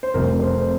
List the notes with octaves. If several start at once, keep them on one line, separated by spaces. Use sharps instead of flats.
C5
F1 F2 C3 G3 A#4
C5